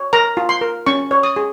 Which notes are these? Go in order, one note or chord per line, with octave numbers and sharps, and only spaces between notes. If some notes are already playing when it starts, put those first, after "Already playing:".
Already playing: C#5
A#4 A#5
F4
C6
A#4
C#4 C#6
C#5
D#6
G#4